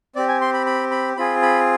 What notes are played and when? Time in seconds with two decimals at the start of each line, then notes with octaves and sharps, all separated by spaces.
0.16 C4 G4 D5
0.28 G#5
0.41 C6
0.54 B5
0.66 B5
0.91 B5
1.17 C4 F4 G#4 B5
1.42 B5